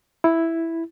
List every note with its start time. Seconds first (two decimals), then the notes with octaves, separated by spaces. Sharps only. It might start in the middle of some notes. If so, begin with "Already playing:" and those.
0.24 E4